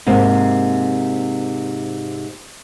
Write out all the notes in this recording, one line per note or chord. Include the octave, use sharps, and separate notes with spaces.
G#2 C3 A#3